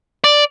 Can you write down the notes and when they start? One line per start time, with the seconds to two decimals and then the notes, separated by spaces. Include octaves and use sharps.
0.24 D5